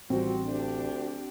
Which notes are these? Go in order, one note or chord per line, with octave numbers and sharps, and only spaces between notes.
A1 F3 G3 C4 F#4
D2 D4 G4